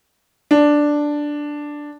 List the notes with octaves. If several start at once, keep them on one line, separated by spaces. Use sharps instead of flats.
D4